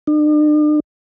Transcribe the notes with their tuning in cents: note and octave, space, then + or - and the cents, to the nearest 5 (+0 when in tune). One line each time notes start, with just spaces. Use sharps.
D4 +45